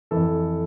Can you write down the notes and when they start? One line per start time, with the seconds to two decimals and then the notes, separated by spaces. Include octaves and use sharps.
0.11 F2 E3 A4